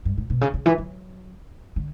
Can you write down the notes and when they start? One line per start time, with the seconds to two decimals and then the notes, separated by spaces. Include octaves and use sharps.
0.05 G2
0.17 A2
0.30 B2
0.41 C#3
0.54 C#3
0.66 E3
0.78 F#3
1.76 D3